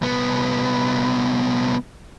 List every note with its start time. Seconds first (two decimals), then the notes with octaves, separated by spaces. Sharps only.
0.02 C2 B3